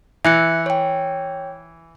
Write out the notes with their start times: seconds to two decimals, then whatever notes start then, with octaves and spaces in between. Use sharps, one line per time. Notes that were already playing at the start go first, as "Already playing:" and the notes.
0.25 E3 E5 F#6 C#7
0.66 C#5 G5